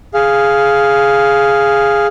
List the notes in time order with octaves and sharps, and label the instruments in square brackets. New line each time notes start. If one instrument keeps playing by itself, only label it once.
[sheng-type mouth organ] G#4 F5